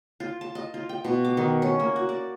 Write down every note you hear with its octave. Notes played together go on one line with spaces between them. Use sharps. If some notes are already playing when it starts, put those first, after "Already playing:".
F4
A5
D#5
F4
G5
B2
D6
D#3
C#4
A#3
F#4
D5